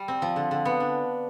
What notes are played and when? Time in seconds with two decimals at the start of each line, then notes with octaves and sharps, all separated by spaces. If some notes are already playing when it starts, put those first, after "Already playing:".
Already playing: G3 G4
0.08 C4
0.22 F3
0.36 D3
0.51 D3
0.65 B3
0.80 D4